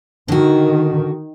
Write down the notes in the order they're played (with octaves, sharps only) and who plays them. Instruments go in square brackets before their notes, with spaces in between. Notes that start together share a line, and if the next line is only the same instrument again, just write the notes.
[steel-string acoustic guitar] D3 F#4 [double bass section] D#3